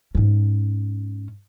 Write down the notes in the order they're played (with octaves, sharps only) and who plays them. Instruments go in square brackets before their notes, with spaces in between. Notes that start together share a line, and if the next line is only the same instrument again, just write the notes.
[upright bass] G#2 C#4